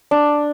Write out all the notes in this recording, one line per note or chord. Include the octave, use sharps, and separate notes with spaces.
D4